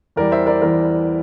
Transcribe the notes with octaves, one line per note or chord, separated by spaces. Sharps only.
E2 E3 G3 A#4 D5
C5 E5
A#4 D5
E2 E3 G3 A#4